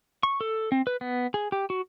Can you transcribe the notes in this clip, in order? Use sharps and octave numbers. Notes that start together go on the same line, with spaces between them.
C#6
A4
C4
B4
B3
G#4
G4
F#4